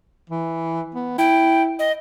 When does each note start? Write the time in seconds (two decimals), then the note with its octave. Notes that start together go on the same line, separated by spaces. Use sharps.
0.30 E3
0.95 B3
1.18 E4 G5
1.79 D#5